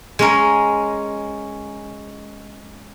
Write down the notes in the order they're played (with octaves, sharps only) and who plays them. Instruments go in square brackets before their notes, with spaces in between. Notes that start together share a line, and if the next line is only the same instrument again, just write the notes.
[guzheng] G#3 C#4 A#4